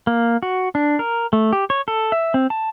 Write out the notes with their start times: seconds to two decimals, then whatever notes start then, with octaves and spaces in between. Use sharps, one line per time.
0.07 A#3
0.43 F#4
0.75 D4
0.99 A#4
1.33 A3
1.53 G4
1.70 C#5
1.88 A4
2.12 E5
2.34 C4
2.50 A5